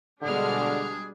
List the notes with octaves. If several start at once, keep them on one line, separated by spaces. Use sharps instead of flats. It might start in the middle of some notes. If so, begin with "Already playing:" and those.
B2 D3 G3 G#3 D4 G#4 F6